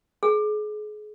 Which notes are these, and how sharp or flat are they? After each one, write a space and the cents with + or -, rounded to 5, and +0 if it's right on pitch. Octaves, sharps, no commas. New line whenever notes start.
G#4 +30